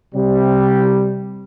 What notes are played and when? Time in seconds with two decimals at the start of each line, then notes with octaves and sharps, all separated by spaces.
0.14 C3 G3